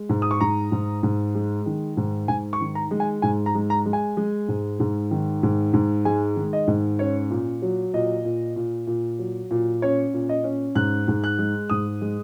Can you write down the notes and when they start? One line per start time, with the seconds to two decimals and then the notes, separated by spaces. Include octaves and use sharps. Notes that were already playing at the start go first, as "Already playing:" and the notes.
Already playing: G#3
0.09 G#2
0.22 D#6
0.31 C#6
0.41 G#2 A#5
0.72 G#2
1.03 G#2
1.35 G#3
1.66 D#3
1.97 G#2
2.28 G#2 G#5
2.53 C#6
2.61 D#3
2.75 A#5
2.91 G#3
3.00 G#5
3.22 G#2 G#5
3.46 A#5
3.55 G#3
3.70 A#5
3.86 G#3
3.93 G#5
4.17 G#3
4.48 G#2
4.80 G#2
5.11 D#3
5.43 G#2
5.74 G#2
6.05 G#3 G#5
6.36 D#3
6.53 D#5
6.67 G#2
6.99 C#4 C#5
7.30 A#2
7.62 F#3
7.94 A#2 D#5
8.25 A#2
8.56 A#2
8.87 A#2
9.19 F#3
9.51 A#2
9.82 C#4 C#5
10.14 A#2
10.29 D#5
10.44 C#4
10.75 G#2 F#6
11.08 G#2
11.24 F#6
11.39 G#3
11.70 G#2 D#6
12.01 G#3